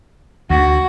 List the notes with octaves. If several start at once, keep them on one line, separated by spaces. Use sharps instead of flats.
D2 F#4